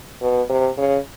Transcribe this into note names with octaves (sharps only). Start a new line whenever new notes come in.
B2
C3
C#3